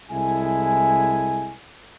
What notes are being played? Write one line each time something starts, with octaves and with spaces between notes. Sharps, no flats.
C2 G#3 E4 A4 G#5